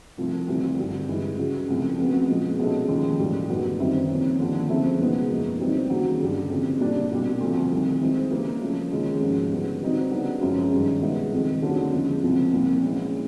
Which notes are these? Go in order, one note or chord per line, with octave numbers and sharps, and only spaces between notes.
C2 C3 F3 A3
D2 C3 E3 G3
G2 D3 G3
G2 E3 G#3
C#2 C#3 F#3
C2 C3 F3 A3
F2 C#3 F#3 B3
A#2 F3 G#3
B2 G#3 C#4 E4 A4
D#2 C#3 F3
A2 E3 G3
F#2 D3 F#3 B3 D#4
F#2 D#3 G3 C4 E4
C3 F3 A#3 C#4
D#2 D3 F3
C#3 F3 A3 C4 E4
E2 B2 G#3 B3 D#4
F#2 C#3 F3 A#3 D#4
E3 G3 C4 D#4
D#2 C#3 F#3 A#3
G2 D3 G3
F2 C#3 E3
A#2 G3 A#3 D4 G4
C2 B2 G3
D2 C3 F3 A3
C2 C3 D#3 G3
E3 G#3 C4 E4 G#4
C#3 E3 G3 A#3
C#3 F3 A3 C#4
D#2 C#3 F3 G#3 C#4
G#2 F3 A#3 C#4 F#4
D3 G3 B3
E3 G3 C4 D#4 F#4
C#3 F#3 B3 D4 F#4
F#2 C#3 F3 G#3 C#4
G2 D#3 G3
B2 G#3 B3 E4
F2 C3 D#3 G#3
D3 G3 A#3 C#4 F#4
E2 C#3 F3 G#3
C2 C3 F3
C2 A#2 F3 A#3
E3 G#3 C#4